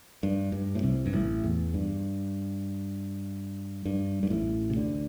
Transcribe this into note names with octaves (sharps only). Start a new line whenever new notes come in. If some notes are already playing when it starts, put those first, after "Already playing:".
G2
G2
A2
C2 C3
G2
A1 A2
E2
G2
G2
G2
A1 A2
C3
D2 D3